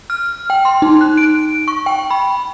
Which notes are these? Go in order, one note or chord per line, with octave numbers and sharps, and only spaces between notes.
F6
G5
C6
D#4
F#6
D7
C#6
G5
B5